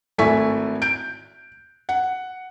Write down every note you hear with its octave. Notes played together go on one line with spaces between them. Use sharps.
G#1 A3 E4 G#5 C#6 B6
G6 D7
F#5